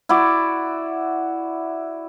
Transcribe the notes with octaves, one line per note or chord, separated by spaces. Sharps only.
E4 F#4 D5